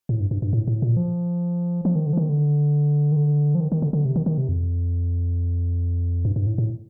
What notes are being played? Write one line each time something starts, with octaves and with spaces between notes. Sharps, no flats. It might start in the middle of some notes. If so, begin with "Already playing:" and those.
A2
G2
G2
G2
A2
A2
A#2
F3
F3
D#3
D3
F3
D#3
D3
D#3
D3
F3
D#3
D#3
D3
D3
C3
D#3
D#3
C3
F2
G2
G2
A2
A2